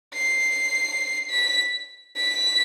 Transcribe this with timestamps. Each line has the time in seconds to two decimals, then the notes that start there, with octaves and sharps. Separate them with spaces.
0.14 C7
1.30 B6
2.17 B6